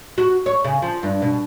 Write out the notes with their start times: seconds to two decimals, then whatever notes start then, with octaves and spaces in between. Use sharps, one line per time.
0.18 F#4
0.46 C#5
0.64 C#3
0.82 F3
1.03 G2
1.22 B2